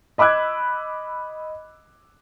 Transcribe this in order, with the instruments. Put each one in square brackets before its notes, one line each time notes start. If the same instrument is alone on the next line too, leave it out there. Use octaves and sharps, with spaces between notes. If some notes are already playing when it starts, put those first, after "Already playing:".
[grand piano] D#5 B5 D6 E6 F#6 G#6